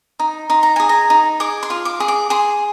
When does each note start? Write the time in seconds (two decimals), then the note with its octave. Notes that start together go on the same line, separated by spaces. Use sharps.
0.19 D#4
0.50 D#4 C6
0.63 A#5
0.76 G#4 G#5
0.89 A#5
1.10 D#4
1.40 G#4 D6
1.63 C6
1.70 F4
1.85 D6
2.00 G#4
2.08 D6
2.30 G#4 C6